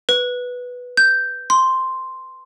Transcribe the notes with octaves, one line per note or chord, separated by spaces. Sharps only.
B4
G6
C6